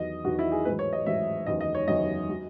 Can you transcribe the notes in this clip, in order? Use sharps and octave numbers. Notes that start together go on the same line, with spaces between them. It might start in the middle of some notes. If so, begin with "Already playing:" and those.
Already playing: E2 D#3 F#3 D#5
E2 D#3 F#3 F#4
E4
G#4
A1 G#2 F#3 B4
C#5
D#5
A1 G#2 F#3 E5
F#1 E2 D#3 F#3 D#5
D#5
C#5
F#1 E2 D#3 F#3 D#5
F#3